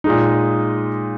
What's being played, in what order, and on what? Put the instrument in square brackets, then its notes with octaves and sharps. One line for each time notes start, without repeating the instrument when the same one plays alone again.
[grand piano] A#2 G#3 D#4